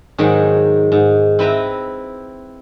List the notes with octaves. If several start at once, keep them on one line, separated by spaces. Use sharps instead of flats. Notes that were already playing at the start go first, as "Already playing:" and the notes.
G#2 D#3 F#3 G#4 F#5 G5
G#2
C4 E4 B4 E5 G5 A#5